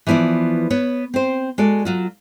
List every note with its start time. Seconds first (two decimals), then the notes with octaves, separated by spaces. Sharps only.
0.07 E3 F3 B3 E4 D5
0.70 B3 B4 C#5
1.14 C4 C5
1.58 G#3 F#4 A4 D5
1.85 F#3 F4 F#4